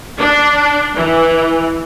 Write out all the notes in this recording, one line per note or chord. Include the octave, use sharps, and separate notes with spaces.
D4
E3